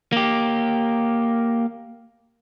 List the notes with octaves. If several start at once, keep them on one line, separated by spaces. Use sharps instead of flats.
A#3 G4